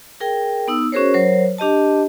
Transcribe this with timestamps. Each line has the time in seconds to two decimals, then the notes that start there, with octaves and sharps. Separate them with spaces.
0.20 G#4 A#4 G5
0.68 B3 D#4 E6
0.92 C#4 F#4 G#4 A#4 C5 C#5
1.14 F#3 A#4 C5 C#5
1.58 D4 G4 D#5 A5